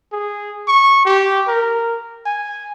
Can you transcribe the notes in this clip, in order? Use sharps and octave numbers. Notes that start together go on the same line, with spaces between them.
G#4
C#6
G4
A#4
G#5